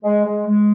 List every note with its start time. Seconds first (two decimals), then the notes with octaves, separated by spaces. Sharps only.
0.03 G#3
0.25 G#3
0.47 G#3